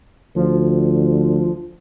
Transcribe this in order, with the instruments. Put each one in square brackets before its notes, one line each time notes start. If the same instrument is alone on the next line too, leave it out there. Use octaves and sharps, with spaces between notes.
[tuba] D2 [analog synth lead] F3